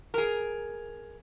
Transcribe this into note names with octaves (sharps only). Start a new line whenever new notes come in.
G#4 A#4